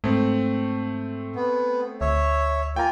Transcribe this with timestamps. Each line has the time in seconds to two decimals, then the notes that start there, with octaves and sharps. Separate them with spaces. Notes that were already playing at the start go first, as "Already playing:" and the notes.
0.04 G#2 A3 C4
1.36 B3
2.01 D2 C#5 E5
2.76 A#3 F4 G5 G#5 A#5